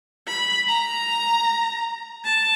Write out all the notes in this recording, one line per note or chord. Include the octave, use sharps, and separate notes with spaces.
B5
A#5
A5